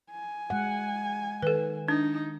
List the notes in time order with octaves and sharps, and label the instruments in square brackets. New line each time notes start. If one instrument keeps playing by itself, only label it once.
[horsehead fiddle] G#5
[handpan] G#3 F#5
[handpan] D#3 [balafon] A4 B4
[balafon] D4 [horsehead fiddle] D#4